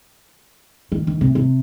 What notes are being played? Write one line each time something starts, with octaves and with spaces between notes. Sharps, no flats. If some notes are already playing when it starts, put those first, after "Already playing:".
D#3
D#3
C3
C3